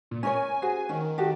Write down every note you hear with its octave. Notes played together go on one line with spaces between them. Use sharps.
A#2
C#4 A#4 C#5 G#5
F#4 G#4 C5
D#3 C#4
F#4 G4 A4